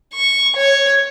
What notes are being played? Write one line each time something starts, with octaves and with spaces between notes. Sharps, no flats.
C#6
C#5